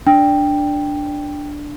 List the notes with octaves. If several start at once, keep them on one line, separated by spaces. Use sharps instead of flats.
D4 G5